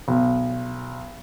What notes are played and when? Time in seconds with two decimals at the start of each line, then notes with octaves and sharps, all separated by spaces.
0.08 B1